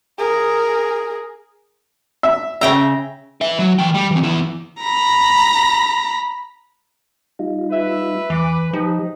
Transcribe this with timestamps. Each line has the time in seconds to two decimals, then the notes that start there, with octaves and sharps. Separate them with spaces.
0.18 G#4 A#4
2.23 E5
2.61 C#3 E5 G5 A#5
3.41 B4 E5
3.59 F#3
3.79 E3 G5
3.94 G3
4.11 E3 C4
4.23 E2 E4
4.81 A#5 B5
7.39 G3 D#4 F4
7.72 B4 E5
8.30 E2 E3 D6
8.73 F3 D#4 G4